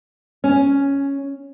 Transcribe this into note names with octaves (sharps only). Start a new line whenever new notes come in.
C#4